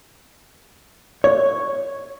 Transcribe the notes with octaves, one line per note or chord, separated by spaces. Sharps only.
C#5